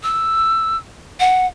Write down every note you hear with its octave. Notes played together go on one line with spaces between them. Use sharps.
E6
F#5